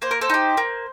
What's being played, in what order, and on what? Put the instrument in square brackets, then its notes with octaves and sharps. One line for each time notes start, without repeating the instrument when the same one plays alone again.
[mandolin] A#3 C5
A#4
A4 C5
D#4 G4
A#3